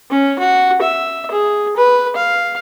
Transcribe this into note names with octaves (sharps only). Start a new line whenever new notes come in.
C#4
F#4
E5
G#4
B4
F5